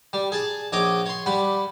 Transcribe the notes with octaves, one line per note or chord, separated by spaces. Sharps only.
G3
G#4 A5
A#1 C#5 D#5 D6 D#6
C#5 C6
G3 F#5 B5